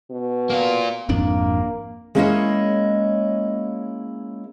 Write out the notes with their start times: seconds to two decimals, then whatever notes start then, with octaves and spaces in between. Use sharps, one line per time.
0.10 B2
0.50 A#3 F4
1.09 G#1 F2 A#3 D4
2.15 G#3 A#3 C#4 E4 C#5 D#5